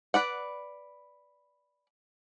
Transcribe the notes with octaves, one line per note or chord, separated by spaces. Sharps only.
B4 D5 F#5